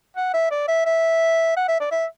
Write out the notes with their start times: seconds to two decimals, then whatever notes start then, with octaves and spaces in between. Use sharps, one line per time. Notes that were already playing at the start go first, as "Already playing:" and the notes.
0.16 F#5
0.34 E5
0.51 D5
0.68 E5
0.86 E5
1.57 F#5
1.68 E5
1.81 D5
1.91 E5